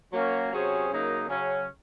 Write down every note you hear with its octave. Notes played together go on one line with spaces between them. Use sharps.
F#3 A#3 C#4
C3 F#3 C#4 G#4 C5
F#2 C#3 F#3 A#3 D#4
C#3 F#3 C#4